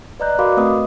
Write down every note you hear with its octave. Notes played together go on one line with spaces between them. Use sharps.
B4 D5 D#5 A#5 F#6 G6
F#4 A#4 F5 B5 C6 D6
A3 C4 B4 D#5 F#5 D#6